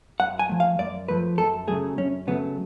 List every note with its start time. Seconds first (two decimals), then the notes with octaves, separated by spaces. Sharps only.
0.20 F#2 F#5
0.39 G#5
0.49 F3 A3
0.60 F5
0.79 F#2 D5
1.08 F3 A3 B4
1.38 F#2 A4
1.67 C#3 F#3 A3 G#4
1.98 F#2 C#4
2.27 C#3 F#3 A3 B3